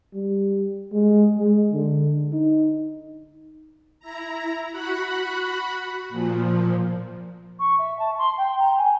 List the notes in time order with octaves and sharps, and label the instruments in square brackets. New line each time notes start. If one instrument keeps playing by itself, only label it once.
[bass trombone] G3
G#3
G#3
D3
D#4
[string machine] E4 A#5
F#4 F#5 B5
A#2 F3
[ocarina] C#6
E5
A5
C6
G5
A#5
G#5